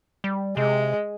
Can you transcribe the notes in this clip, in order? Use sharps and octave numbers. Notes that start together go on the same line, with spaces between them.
G3
C3 G#3